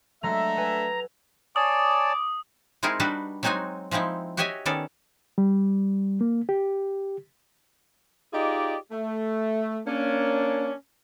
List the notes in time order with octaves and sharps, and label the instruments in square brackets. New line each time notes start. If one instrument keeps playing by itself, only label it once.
[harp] F#3 G#3 [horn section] A3 D4 E5 [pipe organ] A#5
[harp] A4 B4 G#5
[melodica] C#5 D5 A5 [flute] G#5 [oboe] D6 [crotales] D#6
[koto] G#3 C4 D#4 E4 G#4 A#4
G3 D4 D#4 F#4 B4 D5
F#3 G#3 C4 D#4 F#4 G#5
F3 G#3 C4 D#4 E4
F#4 G4 C#5 D#5 E5 G#5
D#3 B3 C#4 A4 D5
[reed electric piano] G3
A#3
G4
[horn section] D#4 F4 G4 G#4 D5 D#5
A3
A#3 C#4 D4